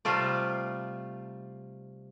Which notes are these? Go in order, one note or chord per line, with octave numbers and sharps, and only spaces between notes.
C3 G3 A3 F4 D5